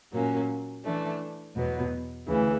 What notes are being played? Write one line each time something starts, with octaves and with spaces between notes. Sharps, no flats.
A#2 F#3 A#3 C#4
E3 A3 D4
E2 B2 F#3 B3
D2 C#3 E3